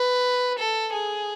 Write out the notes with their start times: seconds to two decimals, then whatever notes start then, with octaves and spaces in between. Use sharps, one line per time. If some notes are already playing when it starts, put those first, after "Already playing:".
Already playing: B4
0.58 A4
0.92 G#4